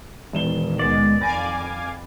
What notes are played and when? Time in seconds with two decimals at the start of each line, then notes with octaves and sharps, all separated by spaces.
0.33 E1 A#2 D#3 A#3 E7 G7
0.79 C#2 G#3 B3 D5
1.21 F2 F5 G#5 B5 D6 A6 A#6